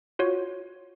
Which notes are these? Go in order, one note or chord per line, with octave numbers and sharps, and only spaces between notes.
F4 F#4 C#5